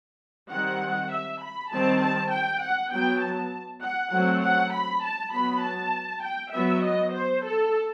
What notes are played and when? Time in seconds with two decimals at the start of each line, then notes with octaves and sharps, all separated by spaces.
0.51 D#3 G3 C4 F#5
1.12 E5
1.42 B5
1.72 D#3 G3 C4 A5
2.01 A5
2.32 G5
2.62 F#5
2.92 F#3 B3 G5
3.22 A5
3.82 F#5
4.12 F#3 A3 C4 F#5
4.42 F#5
4.73 B5
5.03 A5
5.32 F#3 B3 B5
5.63 A5
6.23 G5
6.53 F#3 B3 E5
6.83 D#5
7.13 C5
7.44 A4